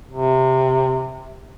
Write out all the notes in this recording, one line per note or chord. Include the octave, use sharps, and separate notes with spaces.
C3